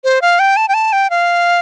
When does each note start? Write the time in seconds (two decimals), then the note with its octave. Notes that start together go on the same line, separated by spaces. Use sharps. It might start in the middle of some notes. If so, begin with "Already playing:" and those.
0.04 C5
0.22 F5
0.39 G5
0.57 A5
0.68 G5
0.74 A5
0.93 G5
1.10 F5